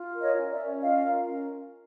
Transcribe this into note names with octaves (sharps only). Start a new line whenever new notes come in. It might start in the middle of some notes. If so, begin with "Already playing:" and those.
Already playing: F4
A#4
C#5 D#5
C#4
D5 E5
C#4
F4 D#5 F5
A#4
C#4